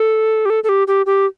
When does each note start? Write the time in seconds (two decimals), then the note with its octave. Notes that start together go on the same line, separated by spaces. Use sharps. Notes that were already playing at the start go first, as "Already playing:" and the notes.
Already playing: A4
0.45 G4
0.50 A4
0.64 A4
0.69 G4
0.88 G4
1.06 G4